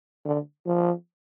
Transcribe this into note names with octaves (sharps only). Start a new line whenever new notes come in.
D3
F3